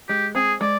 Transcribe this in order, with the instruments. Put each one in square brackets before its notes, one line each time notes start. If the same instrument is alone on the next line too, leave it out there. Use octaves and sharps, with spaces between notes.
[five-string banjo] G#3 [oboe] G4
[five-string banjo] C4 [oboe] G#4
[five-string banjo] G#3 [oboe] D5